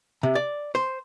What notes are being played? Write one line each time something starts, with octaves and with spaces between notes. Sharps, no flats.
C3
D5
C5